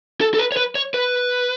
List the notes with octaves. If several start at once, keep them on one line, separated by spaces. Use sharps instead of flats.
A4
A4
B4
C#5
B4
C#5
B4